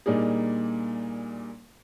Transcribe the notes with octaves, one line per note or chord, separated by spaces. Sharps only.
A#2 G3 A#3 D4 D#4 G#4